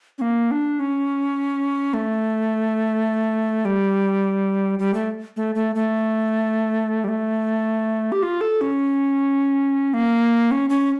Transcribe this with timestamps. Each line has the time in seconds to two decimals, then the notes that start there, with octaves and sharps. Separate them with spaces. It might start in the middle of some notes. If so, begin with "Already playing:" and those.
0.18 C#4
0.21 A#3
0.51 D4
0.80 C#4
1.94 A3
3.65 G3
4.79 G3
4.94 A3
5.37 A3
5.55 A3
5.75 A3
7.04 G3
7.08 A3
8.12 G4
8.23 F4
8.41 A4
8.61 C#4
9.94 A#3
10.51 C#4
10.70 C#4